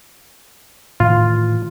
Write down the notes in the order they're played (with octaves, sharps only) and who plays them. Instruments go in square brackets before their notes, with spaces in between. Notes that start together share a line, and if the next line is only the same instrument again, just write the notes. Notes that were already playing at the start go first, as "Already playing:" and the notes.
[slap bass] A2 D#3 E3 [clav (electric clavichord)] F4